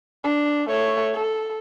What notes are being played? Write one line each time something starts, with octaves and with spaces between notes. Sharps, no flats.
D4
A3 C#5
A4